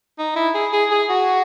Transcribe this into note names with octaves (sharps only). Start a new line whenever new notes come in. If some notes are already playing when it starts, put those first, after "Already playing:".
D#4
E4
G#4
G#4
G#4
F#4